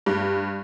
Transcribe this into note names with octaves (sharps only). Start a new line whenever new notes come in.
G2